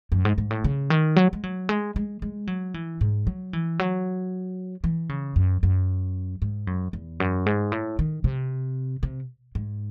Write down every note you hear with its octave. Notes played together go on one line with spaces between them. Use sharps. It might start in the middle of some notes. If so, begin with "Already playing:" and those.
F#2
G#2
G#2
A2
C#3
D#3
F#3
G#3
F#3
G#3
G#3
G#3
F#3
E3
G#2
F#3
E3
F#3
E3
C#3
F#2
F#2
G#2
F#2
E2
F#2
G#2
A2
D#3
C3
C3
G#2